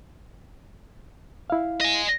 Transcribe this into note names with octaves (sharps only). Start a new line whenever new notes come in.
E4 F5
D#5 G#5